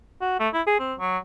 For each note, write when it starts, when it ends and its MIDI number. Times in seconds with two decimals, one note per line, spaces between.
0.21 0.39 66
0.40 0.48 57
0.54 0.61 64
0.67 0.77 68
0.79 0.94 60
0.99 1.18 54